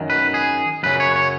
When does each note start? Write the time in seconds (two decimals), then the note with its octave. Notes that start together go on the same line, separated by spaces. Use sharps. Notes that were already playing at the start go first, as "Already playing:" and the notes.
Already playing: F#2 D#3
0.10 B4
0.34 G#4
0.83 F#2 C#3 B4
1.00 C#5
1.16 C#5